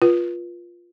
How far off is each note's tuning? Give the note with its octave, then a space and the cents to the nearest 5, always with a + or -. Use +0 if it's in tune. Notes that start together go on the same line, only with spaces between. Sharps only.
F4 +0 B4 -30